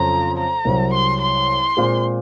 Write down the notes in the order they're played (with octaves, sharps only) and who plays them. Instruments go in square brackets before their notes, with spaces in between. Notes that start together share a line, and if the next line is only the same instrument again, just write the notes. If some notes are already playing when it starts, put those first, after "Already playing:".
Already playing: [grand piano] F2 C#3 F#3 [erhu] A#5
[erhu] A#5
[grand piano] C2 C3 F#3
[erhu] C6
C6
[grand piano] A#2 G#3 C4 F4 G#4